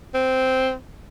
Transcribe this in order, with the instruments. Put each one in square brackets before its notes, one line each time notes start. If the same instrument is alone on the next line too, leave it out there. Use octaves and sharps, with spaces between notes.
[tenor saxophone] C4